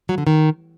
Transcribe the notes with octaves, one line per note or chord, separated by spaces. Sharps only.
F#3
D3
D#3